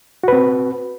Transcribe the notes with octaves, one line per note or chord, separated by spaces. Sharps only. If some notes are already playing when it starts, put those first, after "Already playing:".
C4 F#4 B4